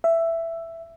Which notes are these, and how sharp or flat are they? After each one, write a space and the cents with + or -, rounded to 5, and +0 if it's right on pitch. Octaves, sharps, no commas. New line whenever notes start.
E5 +10